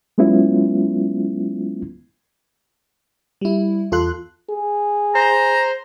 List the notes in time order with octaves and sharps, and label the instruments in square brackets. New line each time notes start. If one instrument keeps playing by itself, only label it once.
[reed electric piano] F#3 G#3 B3 C#4 E4 F4
[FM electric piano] G3 E4
E2 F4 A4 C6 F#6
[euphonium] G#4
[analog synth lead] C5 [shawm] A#5